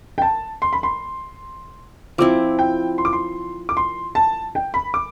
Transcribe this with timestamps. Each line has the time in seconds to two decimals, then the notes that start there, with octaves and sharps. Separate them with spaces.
0.18 G5
0.22 A5
0.62 C6
0.73 B5
0.83 C6
2.18 F3 C4 E4 D6
2.59 G5
2.98 C6
3.05 D6
3.13 C6
3.69 D6
3.77 C6
4.15 A5
4.55 G5
4.74 B5
4.94 D6